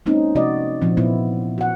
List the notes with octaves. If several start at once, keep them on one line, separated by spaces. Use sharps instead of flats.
G#3 A#3 C4 C#4 D#4
C3 F3 A3 F#4 D5 D#5
A#2 F3 C4
A#2 B3 E4
F#4 F#5